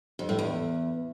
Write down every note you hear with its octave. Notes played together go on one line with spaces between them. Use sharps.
F2
A2
E2